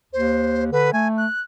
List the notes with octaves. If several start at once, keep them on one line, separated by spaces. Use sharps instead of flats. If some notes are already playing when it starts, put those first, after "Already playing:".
D#2 C5
D3 B4
A3 G#5
F#6